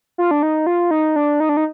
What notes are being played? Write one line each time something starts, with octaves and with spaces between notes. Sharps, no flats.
F4
D4
D#4
F4
D#4
D4
D#4
D4
D#4